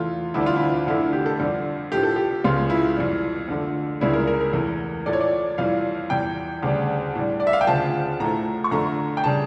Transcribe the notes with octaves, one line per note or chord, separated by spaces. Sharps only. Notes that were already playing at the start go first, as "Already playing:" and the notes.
Already playing: E2 E3 A3 F4
D2 D3 G3 E4
F4
E4
F2 D3 A3 E4
G4
A4
F2 D3 G3
A2 F3 A3 G4
A4
G4
C#2 C#3 F3 F4
E4
F2 E3 G3
F2 D3 A3
C#2 C#3 G3 E4
A#4
A#4
A#4
E2 E3 A3
A2 F3 A3 D5
C#5
D5
F2 E3 G3 F5
E2 E3 G3 G5
D2 C#3 G3
A2 G3
D5
E5
F5
G5
D2 C#3 F3 A5
A2 F3 A3 A#5
C#6
F2 D3 A3 A#5
G5
C#3 G3 A5